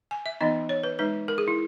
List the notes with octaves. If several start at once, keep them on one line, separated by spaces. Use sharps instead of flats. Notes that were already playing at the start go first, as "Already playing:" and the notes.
G#5
E5
E3 B3 D#4 D#5
C#5
B4
G#3 D#4 B4
A#4
G#4
E4